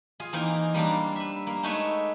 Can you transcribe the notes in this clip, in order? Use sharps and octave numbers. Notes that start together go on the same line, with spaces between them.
F4 G#4
E3 A#3 C4 D#4 A#4
G3 A#3 C4 D4
B4 E5
A#3
G#3 A3 D#4 B4 C#5 E5